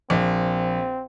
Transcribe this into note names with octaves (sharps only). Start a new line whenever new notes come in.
A#1 C4